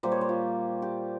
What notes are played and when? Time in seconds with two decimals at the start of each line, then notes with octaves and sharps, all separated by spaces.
0.03 A#2 G3 A#3 C5
0.12 C#5
0.21 C5
0.29 F4
0.82 G4